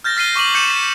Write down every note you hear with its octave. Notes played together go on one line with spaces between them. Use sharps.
F6 G6 A6 A#6
F6 B6 C7 D#7 G7
C#6 D6 D#7 F#7
D6 G6 C#7 D#7 E7
B6